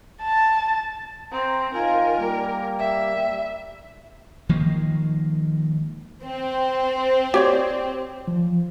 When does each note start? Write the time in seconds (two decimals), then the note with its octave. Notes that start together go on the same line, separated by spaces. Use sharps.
0.22 A5
1.32 C4 A#5
1.74 D#3 F4 A#4 G#5
2.19 G3 A#3
2.79 E5
4.49 D#3 F3 G#3 A#3
6.24 C4
7.34 G4 C#5 D5
8.28 F3